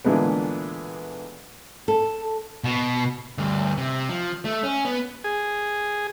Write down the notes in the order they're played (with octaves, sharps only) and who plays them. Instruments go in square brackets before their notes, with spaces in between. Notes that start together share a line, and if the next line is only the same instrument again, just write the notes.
[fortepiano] A#2 D3 E3 G#3 A3 B3
[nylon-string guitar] A4
[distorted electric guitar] B2
[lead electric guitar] D2 G2
C3
F3
A3
C#4
B3
[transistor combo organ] G#4